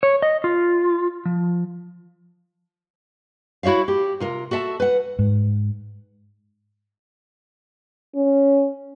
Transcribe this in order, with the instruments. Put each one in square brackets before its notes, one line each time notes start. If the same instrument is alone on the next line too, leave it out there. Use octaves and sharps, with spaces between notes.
[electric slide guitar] C#5
D#5
F4
F3
[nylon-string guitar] E4 F#4 C#5 E5 F5
G4
C3 F4 A#4
F#4 A4 E5 A5
B4 F#5
[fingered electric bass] G#2
[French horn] C#4